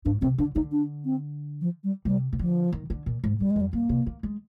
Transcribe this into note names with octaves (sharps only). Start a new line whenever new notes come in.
G#2 D4
C3 C4
D3 D4
D3 D#4
D4
C4
F3
G3
C3 G3
C3
D3 F3
D#3
D3
A#2
G#2
G2 G3
G#3
F2
G3
G2 A#3
C3
A#3
G#3